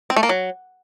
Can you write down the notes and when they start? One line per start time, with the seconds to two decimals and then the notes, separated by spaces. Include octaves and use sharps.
0.10 C4
0.16 A3
0.23 A#3
0.29 F#3